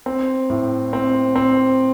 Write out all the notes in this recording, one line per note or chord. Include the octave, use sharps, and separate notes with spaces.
C4
A2
C4
C4